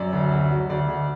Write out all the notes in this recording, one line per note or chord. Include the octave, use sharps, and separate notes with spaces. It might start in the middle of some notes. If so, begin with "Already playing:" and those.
Already playing: F#2 D5
D2
D2
F#3
D2 D5
D2